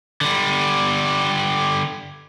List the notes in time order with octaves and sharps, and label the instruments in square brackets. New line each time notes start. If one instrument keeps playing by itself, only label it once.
[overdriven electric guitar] D3 G3